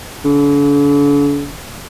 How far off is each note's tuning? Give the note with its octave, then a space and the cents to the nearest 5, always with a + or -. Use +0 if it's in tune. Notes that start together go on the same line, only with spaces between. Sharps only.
D3 -45